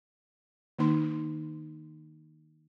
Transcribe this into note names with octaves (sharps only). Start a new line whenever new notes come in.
D#3 A#3 D#4 C6